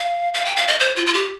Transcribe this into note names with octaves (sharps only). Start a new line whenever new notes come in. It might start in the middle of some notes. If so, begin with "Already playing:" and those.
Already playing: F5
F5
G5
F5
D#5
C5
F4
F4
G4